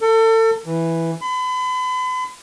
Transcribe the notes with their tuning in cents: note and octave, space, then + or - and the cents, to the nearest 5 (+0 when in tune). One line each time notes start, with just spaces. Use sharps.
A4 +35
E3 +0
B5 +40